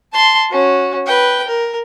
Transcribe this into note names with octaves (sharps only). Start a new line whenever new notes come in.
A5 C6
C#4 F#4
B4 G5
A#4